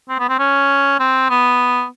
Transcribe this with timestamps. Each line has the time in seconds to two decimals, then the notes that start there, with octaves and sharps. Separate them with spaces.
0.09 C4
0.19 B3
0.29 C4
0.39 C#4
0.99 C4
1.30 B3